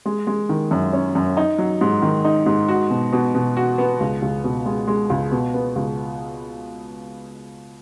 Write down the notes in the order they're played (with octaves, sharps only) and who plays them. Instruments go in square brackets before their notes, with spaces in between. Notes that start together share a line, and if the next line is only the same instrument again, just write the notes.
[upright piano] G#3
G#3
D#3
F#2
C#4
F#2
D#4
F#3
G#2
D#3
D#4
G#2
F#4
B2
B2
B2
F#4
B3
C#2
C#2
B2
G#3
G#3
C#2
B2
B3
C#2